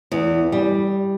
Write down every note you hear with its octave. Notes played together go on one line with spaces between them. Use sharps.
E2
G3